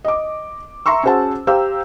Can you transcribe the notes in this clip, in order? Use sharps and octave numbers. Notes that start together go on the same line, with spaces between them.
D#5 D6
E5 A#5 C6 C#6 E6
C#4 F#4 G#4 C5 F#5 A5
G4 C5 F5 A#5 E6